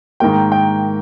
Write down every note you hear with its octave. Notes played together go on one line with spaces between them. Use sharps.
G#2 D#3 A#3 G5
G5